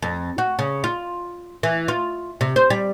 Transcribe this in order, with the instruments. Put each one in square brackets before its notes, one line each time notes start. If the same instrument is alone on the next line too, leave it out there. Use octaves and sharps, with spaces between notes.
[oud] F2
F#4
C#3
F4
E3
F4
C3
C5
G3